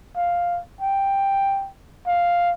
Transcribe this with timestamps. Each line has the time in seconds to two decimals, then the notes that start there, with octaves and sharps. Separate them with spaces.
0.16 F5
0.81 G5
2.07 F5